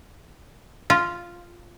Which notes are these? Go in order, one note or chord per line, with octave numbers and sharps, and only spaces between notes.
F4